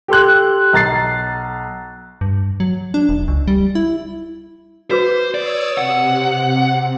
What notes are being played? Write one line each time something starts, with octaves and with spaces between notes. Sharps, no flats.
G4 A4 C6 F#6
B1 A#5 A6 C7
G2
F#3
D4
E1
C#2
G3
E4
F#4 B4 C5 D6
C#5 D5 D#6 E6
C3 F#5